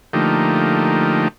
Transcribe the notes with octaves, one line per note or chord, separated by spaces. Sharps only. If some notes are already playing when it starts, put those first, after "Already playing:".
D3 F3 A3 A#3 D#4 G4